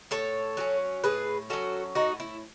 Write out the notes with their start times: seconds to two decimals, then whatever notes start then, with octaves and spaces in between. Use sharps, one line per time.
0.11 A2 A4 C#5
0.57 F#3 C#4
1.04 A2 G#4 B4
1.50 F#3 C#4 F#4 A4
1.95 A2 D#4 F#4
2.20 E4